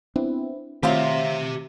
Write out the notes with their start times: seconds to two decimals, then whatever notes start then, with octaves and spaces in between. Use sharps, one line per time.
0.16 B3 C4 D4 E4
0.83 D#3 F3 F#3 A3 C4 F4 G4 E5